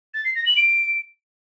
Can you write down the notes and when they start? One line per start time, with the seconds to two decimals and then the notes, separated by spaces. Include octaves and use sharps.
0.14 A6
0.24 C7
0.35 A#6
0.45 F#7
0.56 D7